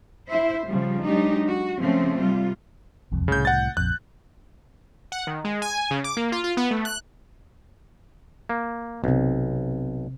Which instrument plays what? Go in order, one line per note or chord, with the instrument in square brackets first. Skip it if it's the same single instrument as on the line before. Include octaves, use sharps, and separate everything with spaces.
[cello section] E4 C5 E5
C#3 F3 G3
F#3 G#3 D4 D#4 G4
F#4
C#3 F3 A3 C4 C#4
C3 G3 F4
[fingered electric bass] E1 C2 F2
[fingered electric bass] C2 A2 [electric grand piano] C#3 G6
[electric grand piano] F#5 A6
[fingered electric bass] A#1 F2 [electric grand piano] F#6
[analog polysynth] F#5
D#3
G#3
G#5
C#3
D6
A#3
F4
F4
B3
A3
F#6
[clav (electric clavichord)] A#3
[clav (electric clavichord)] B1 [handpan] C3 C4